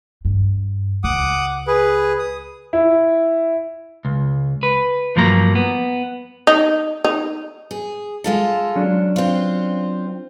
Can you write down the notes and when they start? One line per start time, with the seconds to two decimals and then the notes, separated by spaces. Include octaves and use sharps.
0.25 G2
1.04 C#2 F#5 D6 D#6
1.67 G#4 B4
2.19 D#6
2.73 E4
4.05 C#2
4.63 B4
5.16 G2 F3 F#3 A#3 A#5
5.55 B3
6.47 D#4
7.04 D#4
7.71 G#4
8.24 G#3 F4 A4
8.76 F#3 C#4 D4
9.16 C4 F4